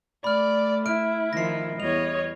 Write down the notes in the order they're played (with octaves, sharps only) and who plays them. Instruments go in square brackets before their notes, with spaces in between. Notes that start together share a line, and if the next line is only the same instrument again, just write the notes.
[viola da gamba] A3 [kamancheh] D5 [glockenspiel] B5 F6
[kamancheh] E4 [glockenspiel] F6 D7
[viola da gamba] D#3 F3 [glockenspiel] A#6 C7
[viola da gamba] E2 G3 [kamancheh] C#5 D#5 [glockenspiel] F7